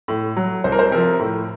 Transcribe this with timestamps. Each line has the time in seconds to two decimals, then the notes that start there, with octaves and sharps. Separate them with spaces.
0.08 A2
0.36 F#3
0.64 C2 C5
0.72 A#4
0.79 C5
0.91 C3 F3 A#4
1.20 A2